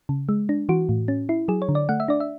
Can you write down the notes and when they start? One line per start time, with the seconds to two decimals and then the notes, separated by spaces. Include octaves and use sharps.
0.09 C#3
0.29 G#3
0.49 D4
0.69 E3 F#4
0.89 A2
1.08 C#4
1.29 E4
1.48 F#3 G#4
1.62 C#5
1.69 D3
1.75 D5
1.89 A3 F#5
2.00 E5
2.08 D4 D5
2.20 E5